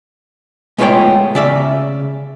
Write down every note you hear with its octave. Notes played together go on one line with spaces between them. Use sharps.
G#3 A3 B3 F4 C#5 G5
C#3 D5 E5